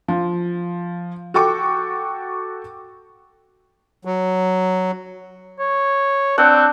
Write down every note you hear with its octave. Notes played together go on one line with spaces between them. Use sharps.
F3
F#4 A4 G5 C#6 D6
F#3
C#5
C4 D4 F#5 E6